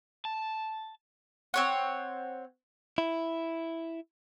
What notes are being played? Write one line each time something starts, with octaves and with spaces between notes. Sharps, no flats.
A5
C4 C#5 F#5
E4